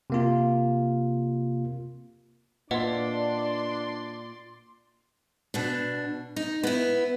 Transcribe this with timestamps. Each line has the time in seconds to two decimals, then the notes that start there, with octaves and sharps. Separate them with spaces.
0.10 C3 A#3 F4
2.71 A#2 D4 B4 D5 D#5 F#5 C6
5.54 B2 D4
6.36 D#4
6.63 B3 E4